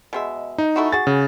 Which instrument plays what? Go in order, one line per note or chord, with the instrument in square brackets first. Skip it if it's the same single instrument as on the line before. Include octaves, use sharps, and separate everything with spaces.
[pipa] B2 G#3 E5
[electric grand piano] D#4
[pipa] A3 E4 F#4
[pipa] F#4 G#4 [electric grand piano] A6
[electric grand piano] C#3